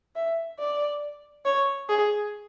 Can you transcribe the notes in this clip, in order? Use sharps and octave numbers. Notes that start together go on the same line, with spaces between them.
E5
D5
C#5
G#4